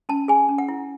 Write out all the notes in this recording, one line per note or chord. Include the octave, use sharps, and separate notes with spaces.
C#4 A5
G#4 G#5
C#4
F#5
E4